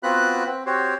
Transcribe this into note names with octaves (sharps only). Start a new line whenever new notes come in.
B3 C4 F4 F#4 B5 F#6
C4
C4 F#4 G4 C5 C#5